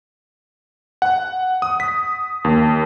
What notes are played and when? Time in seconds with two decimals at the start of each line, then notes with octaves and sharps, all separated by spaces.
1.02 F#5
1.62 D#6
1.80 B6
2.45 D#2